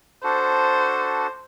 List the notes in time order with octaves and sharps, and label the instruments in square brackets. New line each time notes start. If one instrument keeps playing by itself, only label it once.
[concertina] D4 F#4 A4 [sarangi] C5